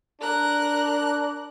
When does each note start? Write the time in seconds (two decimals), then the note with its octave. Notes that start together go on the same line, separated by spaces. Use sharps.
0.21 D4 A#4 F#6